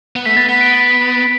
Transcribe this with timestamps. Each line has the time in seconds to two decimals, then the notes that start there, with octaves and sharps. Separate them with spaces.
0.16 B3
0.25 A3 B6
0.37 B3 A6
0.48 B3 B6
0.61 D7